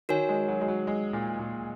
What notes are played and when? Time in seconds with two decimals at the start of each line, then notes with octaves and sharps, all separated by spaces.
0.09 D#3 F#4 A#4 C#5 G#5
0.29 G#3
0.48 F#3
0.61 G#3
0.68 F#3
0.87 G#3
1.13 A#2
1.39 A#2